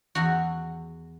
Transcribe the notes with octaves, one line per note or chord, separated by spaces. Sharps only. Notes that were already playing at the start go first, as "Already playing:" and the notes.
E2 F#4